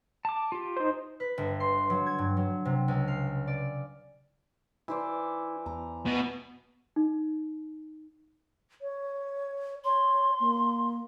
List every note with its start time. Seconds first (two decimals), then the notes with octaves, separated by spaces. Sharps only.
0.25 A5 D6
0.52 F4 G4
0.77 D#4 C5
1.20 B4
1.38 G1
1.60 C6
1.90 F#3
2.06 G#6
2.18 G2
2.37 F#3
2.65 C3
2.88 C#2
3.08 F5
3.47 D5
4.88 E3 E4 C5 D5
5.66 E2 A#5
6.06 B2 B3
6.96 D#4
8.81 C#5
9.84 C#5 C6
10.40 A#3